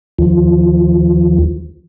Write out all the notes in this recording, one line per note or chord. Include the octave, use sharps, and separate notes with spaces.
D#2 F3